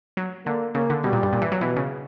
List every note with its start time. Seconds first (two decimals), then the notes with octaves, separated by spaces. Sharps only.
0.17 F#3
0.46 D3 A#3
0.75 C#3 A#3
0.90 D3
1.04 B2 G3
1.13 A#2
1.23 G2
1.33 A#2
1.42 E3
1.52 F#3
1.61 B2 E3
1.76 C#3